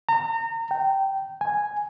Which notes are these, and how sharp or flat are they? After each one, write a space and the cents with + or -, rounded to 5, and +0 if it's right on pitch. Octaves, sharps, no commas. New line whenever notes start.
A#5 -30
G5 -10
G#5 -5